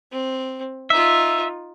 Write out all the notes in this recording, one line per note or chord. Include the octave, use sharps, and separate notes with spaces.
C4
D#4 F4 E5